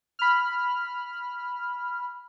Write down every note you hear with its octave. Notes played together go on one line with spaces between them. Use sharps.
B5 F6